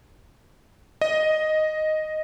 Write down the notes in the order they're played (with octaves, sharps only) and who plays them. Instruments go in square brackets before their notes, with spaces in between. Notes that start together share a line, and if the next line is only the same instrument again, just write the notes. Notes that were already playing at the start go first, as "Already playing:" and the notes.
[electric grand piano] D#5